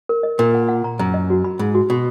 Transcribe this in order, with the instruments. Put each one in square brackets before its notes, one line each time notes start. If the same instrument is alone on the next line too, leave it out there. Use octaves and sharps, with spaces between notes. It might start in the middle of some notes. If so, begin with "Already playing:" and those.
[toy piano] A#4
D#5
[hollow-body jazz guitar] A#2 [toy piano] A#4
[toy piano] F#5
F#5
A#5
[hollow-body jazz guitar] F#2 [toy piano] A#5
[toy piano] D#5
F#4
B5
[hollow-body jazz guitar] G#2 [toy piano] B5
[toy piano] F#4
[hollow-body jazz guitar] B2 [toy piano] F#4